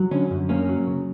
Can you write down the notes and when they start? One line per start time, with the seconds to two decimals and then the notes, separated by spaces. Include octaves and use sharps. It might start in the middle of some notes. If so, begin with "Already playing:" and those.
Already playing: F#3
0.11 D3 C#4
0.30 F#2
0.49 A#3 C#4
0.69 F#3
0.87 C#3